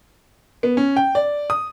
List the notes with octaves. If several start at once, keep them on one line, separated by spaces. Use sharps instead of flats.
B3
C#4
G5
D5
D#6